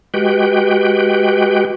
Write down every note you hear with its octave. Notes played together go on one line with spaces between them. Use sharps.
G#3 F#4 G4 B4 G5